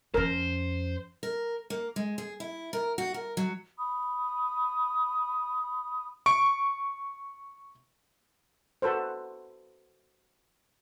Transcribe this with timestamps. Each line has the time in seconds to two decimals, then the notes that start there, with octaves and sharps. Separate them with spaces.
0.14 F2 C#4 A#4 C5
1.23 A#4
1.70 A#3
1.96 G#3
2.18 G#4
2.40 E4
2.73 A#4
2.98 F#4
3.14 A#4
3.37 F#3
3.78 B5 D#6
6.26 C#6 D7
8.82 F#4 A4 B4 C5